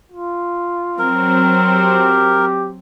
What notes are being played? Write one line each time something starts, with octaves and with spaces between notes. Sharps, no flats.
F4
F#3 C4 A#4
G4